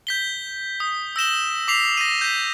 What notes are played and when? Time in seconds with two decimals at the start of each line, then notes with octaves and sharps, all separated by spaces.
0.07 G6 B6 G7
0.80 D#6
1.16 E6 A#6 E7 G7
1.68 D6 B6 C7 F7
1.97 A#6 D#7
2.21 G6 B6